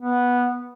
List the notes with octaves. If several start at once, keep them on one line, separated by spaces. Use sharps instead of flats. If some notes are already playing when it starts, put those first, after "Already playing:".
B3